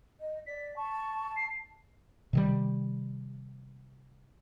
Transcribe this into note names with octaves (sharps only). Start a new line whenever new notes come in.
D#5
D5 B6
A5 C#6
C7
C3 D#3 G3